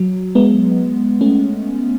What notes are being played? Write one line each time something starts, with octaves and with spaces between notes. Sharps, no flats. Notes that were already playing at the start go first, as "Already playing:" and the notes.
Already playing: F#3
G#3 B3
A3 C#4